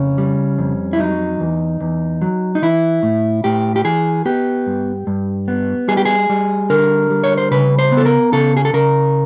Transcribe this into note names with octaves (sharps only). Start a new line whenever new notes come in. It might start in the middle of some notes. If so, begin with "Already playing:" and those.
Already playing: F2 C#3 C#4
G3
F2
E4
F#3 D#4
E2
E2
F#3
D#4
E3 E4
A2
A2 G4
G4
E3 G#4
B3 G4
G2
G2
B3
G3 G#4
G4
G#4
G3
D3 A#4
G3
C#5
C5
C#3 B4
C5
B3
A4
A#4
C#3 A4
G#4
A4
C#3 A#4